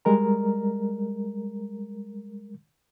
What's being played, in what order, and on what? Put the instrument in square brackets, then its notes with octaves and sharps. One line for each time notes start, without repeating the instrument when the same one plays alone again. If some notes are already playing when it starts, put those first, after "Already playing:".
[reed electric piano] G3 G#3 A#4 A#5